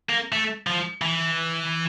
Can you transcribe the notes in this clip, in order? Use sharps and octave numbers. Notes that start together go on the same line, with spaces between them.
A#3
A3
F3
E3